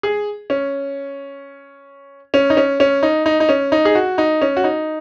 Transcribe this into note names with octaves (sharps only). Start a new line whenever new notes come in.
G#4
C#4
C#4
D#4
C#4
C#4
D#4
D#4
D#4
C#4
D#4
G#4
F#4
D#4
C#4
F#4
D#4